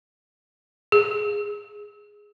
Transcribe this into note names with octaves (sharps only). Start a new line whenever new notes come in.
G#4